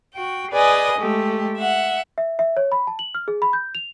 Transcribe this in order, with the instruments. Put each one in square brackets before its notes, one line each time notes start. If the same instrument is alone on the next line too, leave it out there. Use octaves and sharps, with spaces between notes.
[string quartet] F#4 G5
G#4 B4 D5 D#5 G#5
G#3 A3 G4
E5 F#5
[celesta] E5
E5
C#5
B5
A5
F#7
F6
G#4
B5
G6
F7